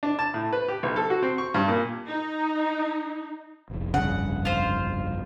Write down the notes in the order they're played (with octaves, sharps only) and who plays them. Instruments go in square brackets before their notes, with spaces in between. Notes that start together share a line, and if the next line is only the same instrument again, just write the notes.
[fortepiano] D4
A5
A2
B4
G4
B1
A4
F#4
C4
C#6
G2
A#2
[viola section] D#4
[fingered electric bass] F1 A#1
[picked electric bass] G2 C#3 [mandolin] F#5
[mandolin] F4 C5